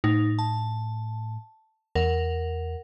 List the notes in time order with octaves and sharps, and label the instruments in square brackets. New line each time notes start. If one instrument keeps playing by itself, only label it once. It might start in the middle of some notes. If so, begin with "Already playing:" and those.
[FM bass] A2 [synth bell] D#4
[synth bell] A5
[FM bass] E2 [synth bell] A#4 F#5